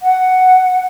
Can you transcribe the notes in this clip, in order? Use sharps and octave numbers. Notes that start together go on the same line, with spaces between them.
F#5